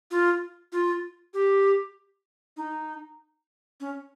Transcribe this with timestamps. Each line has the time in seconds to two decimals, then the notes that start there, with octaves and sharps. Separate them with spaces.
0.11 F4
0.72 F4
1.34 G4
2.57 D#4
3.80 C#4